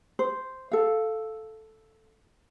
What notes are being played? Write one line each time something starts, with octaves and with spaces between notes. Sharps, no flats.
C5
A4 F5